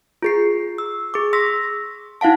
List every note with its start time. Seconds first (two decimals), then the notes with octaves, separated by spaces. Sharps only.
0.22 F4 G#4 C7
0.78 E6
1.14 G#4 D6
1.33 C6 E6 A#6 B6
2.21 D#4 E4 F5 F#5 A5